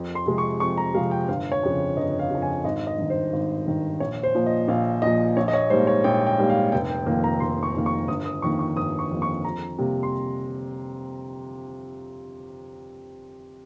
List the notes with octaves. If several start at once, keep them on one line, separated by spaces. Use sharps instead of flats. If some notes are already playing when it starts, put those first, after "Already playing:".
Already playing: F2
C6
C3 F3 G#3
C#6
F2 C#6
A#5
C3 F3 G#3 F5
G5
G1 F5
C#5
F2 C#3
G1 D#5
F5
F2 C#3
G#5
G#1 D#5
D#5
G2 D#3
C5
G#1
G2 D#3
A#1 C#5
C5
A#2 F3
D#5
A#1 F5
A#2 F3 D#5
A#1 C#5
D#5
C#5
G#2 G3 A#3 C5
C#5
A#1 G5
G5
G#2 G3 A#3
F5
F1 G5
G5
F2 D#3 A#3
A#5
F1 C6
C#6
F2 D#3 A#3
C#6
G1 D#6
D#6
F2 D#3 A#3 C#6
C#6
G1 D#6
C#6
F2 D#3 A#3
C#6
F2 A#5
C3 G3 A#3
C6